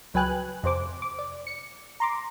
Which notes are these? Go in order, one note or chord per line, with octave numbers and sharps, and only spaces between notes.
C#2 F#3 B4 G5 G#5 F#6
F2 C3 C5 D6
D6
D5
C#7
A#5 C6 D6